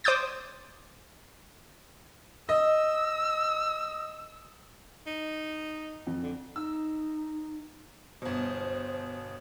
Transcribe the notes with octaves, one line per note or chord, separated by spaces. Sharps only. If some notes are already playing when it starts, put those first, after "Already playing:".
C5 D6 D#6 G6 A6
D#5 E6
D#4
F2
D3
D#4 E6
G1 B2 C5